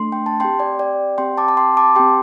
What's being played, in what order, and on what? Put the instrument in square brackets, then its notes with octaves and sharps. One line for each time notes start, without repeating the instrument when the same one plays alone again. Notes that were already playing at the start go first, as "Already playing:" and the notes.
Already playing: [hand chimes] A3 D4 A4 C6
G5
A5
C4 G4 G5 C6
D5 G5
D5 G5
C4 G4 G5 C6
A5 D6
A5
G5 C6
A5 D6
C4 G4 G5 C6